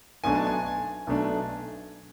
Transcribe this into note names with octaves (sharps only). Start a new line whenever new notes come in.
B1 B2 A3 D4 G#5
A5
G#5
B1 B2 A3 D4